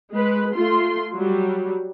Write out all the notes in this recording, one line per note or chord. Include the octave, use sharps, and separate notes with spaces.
G#3 B4
A3 F4 C6
F#3 G3